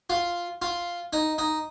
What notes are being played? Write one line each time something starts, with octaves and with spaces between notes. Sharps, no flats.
F4
F4
D#4
D#4